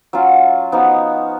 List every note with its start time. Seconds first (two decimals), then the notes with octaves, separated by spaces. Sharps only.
0.13 F#3 C#4 F4
0.72 F3 B3 D#4 F#4